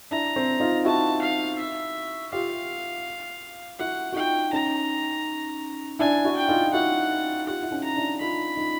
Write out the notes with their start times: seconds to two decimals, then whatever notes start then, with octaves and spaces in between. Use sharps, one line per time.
0.11 D4 E4 A#5
0.36 C4
0.60 D#4 F4
0.85 E4 F#4 A5
1.21 F5
1.58 E5
2.32 F4 G4 F5
3.79 E4 F#4 F#5
4.12 F#4
4.16 D#4 F4 G5
4.53 C#4 D#4 A#5
5.99 D4 E4 G#5
6.25 E4 F#4
6.36 G5
6.48 D#4 F4
6.65 F4
6.73 E4 F#4 F#5
7.47 F4 G4 F#5
7.63 E4
7.71 C#4 D#4
7.84 A#5
7.96 D4 E4
8.20 D#4 F4 B5
8.57 D#4 F4